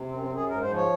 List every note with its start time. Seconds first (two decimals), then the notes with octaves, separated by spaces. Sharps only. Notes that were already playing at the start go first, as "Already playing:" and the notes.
Already playing: C3
0.08 F#2 C4
0.22 C4
0.29 F#2
0.36 G#4
0.48 G#2 A#4
0.62 C5
0.68 F3
0.76 C#5